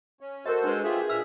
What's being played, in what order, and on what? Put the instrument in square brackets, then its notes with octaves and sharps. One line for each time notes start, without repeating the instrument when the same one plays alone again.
[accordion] C#4
[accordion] F#4 A4 C5 [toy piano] A#4 D#5
[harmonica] G#3 [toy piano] D4 B4
[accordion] F4 G4 E5 [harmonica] G#4
[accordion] A#2 E5 F6 [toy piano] E6